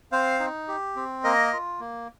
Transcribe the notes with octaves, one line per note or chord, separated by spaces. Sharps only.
C4 C5 F5
D#4
G4
C4
A#3 A#4 D#5
F4
A#3